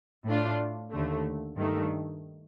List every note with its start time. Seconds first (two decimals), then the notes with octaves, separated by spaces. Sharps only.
0.26 A2 A3 D4 F4
0.91 D#2 D3 A3
1.56 G2 D#3 A3